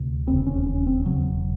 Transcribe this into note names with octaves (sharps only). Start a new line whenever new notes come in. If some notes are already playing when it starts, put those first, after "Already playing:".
Already playing: D2 C3
E1 D#2 C#3 C4
C#4
C#4
C4
E1 D#2 C#3 F#3